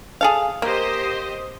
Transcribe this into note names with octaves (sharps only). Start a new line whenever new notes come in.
G#4 A4 F5
A#3 G4 C5 D#5